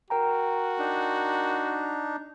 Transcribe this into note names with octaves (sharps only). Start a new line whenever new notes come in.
F#4 A#4 G5 A#5
D4 D#4